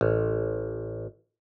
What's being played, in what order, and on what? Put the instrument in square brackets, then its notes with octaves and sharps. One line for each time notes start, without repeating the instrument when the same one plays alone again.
[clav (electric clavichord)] A1